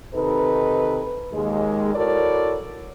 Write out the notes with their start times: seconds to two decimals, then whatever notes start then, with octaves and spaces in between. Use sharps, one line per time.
0.14 C3 D#3 D#4 A4 B4
1.32 D#2 G#3
1.95 E4 F#4 A4 A#4 C#5 D5